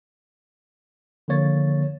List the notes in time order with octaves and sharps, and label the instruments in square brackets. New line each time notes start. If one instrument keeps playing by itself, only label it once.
[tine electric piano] D3 F3 A#3 C#5 A6